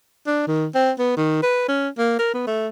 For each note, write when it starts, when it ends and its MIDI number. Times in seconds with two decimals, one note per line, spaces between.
0.27 0.47 62
0.47 0.66 51
0.74 0.91 60
0.99 1.13 59
1.17 1.42 51
1.43 1.64 71
1.68 1.89 61
1.98 2.16 58
2.19 2.33 70
2.34 2.45 59
2.47 2.68 57